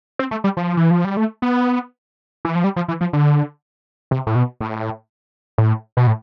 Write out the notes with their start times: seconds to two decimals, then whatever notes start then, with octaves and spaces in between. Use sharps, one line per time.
0.19 C4
0.31 A3
0.44 G3
0.57 F3
0.77 E3
0.91 F3
1.05 G3
1.17 A3
1.42 B3
2.45 E3
2.55 F3
2.64 G3
2.76 F3
2.88 E3
3.01 F3
3.13 D3
4.11 C3
4.27 A2
4.35 B2
4.60 A2
5.58 A2
5.97 B2
6.07 A2